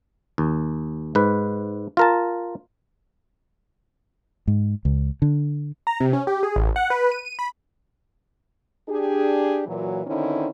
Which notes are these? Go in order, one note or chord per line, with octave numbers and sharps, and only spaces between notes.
D#2
G#2 B4
F4 A#4 A5
G#2
C#2
D3
A#5
C3
C#4
G4
G#4
A1
F#5
B4
D#7
D#7
B5
D4 G4 G#4
A#2 E3 F#3
D3 D#3 C4 C#4 D#4 E4